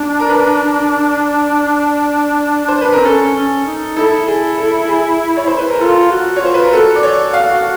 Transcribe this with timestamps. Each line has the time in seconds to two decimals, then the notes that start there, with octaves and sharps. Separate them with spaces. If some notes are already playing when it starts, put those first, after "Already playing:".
Already playing: D4
0.20 A#4
0.29 B4
2.68 C5
2.81 B4
2.92 C4 A#4
3.05 C#4 A4
3.35 C#4
3.66 D#4
3.97 E4 A4
4.27 G#4
4.58 A4
4.88 G#4
5.37 C#5
5.47 C5
5.58 B4
5.70 A#4
5.80 F4 A4
6.11 F#4
6.36 C#5
6.41 F4 C5
6.54 B4
6.63 A#4
6.72 F#4 A4
6.96 D5
7.03 C#5
7.33 F5